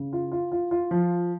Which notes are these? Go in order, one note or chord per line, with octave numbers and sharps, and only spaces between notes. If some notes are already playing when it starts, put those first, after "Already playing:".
Already playing: C#3
F4
F4
F4
F4
F3